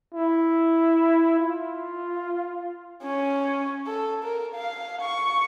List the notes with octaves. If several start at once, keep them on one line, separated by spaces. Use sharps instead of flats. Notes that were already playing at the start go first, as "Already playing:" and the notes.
E4
F4
C#4
A4
A#4
F5
C#6